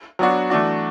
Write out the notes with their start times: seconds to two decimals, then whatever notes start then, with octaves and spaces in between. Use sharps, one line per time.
0.19 F#3 B3 D4 F#4
0.50 E3 A3 D4 F#4